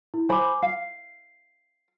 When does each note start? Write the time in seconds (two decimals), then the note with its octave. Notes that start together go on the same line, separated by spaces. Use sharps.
0.14 E4
0.29 C5 G#5 B5 D6
0.63 F5 C7